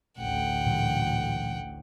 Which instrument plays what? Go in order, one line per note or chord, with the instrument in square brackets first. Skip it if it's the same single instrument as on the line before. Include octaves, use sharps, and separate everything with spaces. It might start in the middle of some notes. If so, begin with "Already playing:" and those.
[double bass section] A1 D2 [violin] F#5 G5
[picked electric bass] A#2 E3 F#3